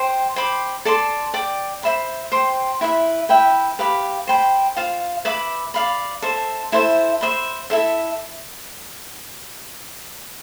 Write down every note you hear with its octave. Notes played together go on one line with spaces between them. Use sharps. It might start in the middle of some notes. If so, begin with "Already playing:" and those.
Already playing: C5 G5 C6
C5 G5 B5 D6
A4 D5 A5 C6
D5 G5 D6
C5 E5 B5
C5 G5 C6
E4 B4 E5
E4 B4 E5 G5
G4 B4 F5 B5
C5 G5 B5
F4 C5 F5
B4 E5 B5 D6
D5 F5 B5
A4 C5 E5
E4 A4 C5 E5
C5 E5 B5
E4 A4 E5